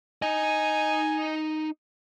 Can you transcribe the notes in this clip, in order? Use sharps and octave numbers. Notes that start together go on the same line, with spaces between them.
D#4 D#5 G#5